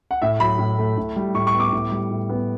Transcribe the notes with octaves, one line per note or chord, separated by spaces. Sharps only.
F#5
A2 E5
F#3 B5
A2
A3
A2
G3
A2 C#6
C#6
B3
D6
A2
G3
A2
B3